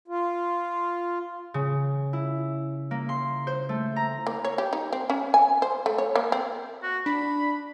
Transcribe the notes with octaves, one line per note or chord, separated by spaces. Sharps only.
F4
C#3
E4
A#3
C6
C5
A3
A#5
A#3
C#5
G4
D#4
C4
C#4
G#5
C5
A3
C#5
A#3
C4
F#4
D4 B5